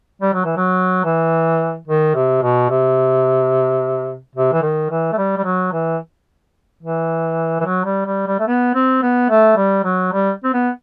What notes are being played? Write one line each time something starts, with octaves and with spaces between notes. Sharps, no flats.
G3
F#3
E3
F#3
E3
D#3
C3
B2
C3
C3
E3
D#3
E3
A3
G3
G3
F#3
E3
E3
E3
F#3
G3
G3
G3
A3
B3
C4
B3
A3
G3
F#3
G3
C4
B3